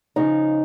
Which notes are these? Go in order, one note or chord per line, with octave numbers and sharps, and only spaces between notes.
C#3 F3 D#4